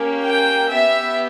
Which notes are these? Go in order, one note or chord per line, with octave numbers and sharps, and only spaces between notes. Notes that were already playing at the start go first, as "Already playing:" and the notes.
Already playing: A#3 C#4 G4
G5
B3 G4 E5